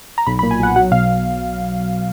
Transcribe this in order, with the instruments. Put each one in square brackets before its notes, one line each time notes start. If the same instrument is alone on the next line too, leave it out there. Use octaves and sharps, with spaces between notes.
[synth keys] A#5
B1 B5
B5
A#2
G#5
B1 F#5
F#3 F#5
B2 F5